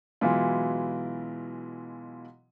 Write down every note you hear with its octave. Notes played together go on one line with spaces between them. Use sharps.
B2 E3 F#3 G#3 E4 F4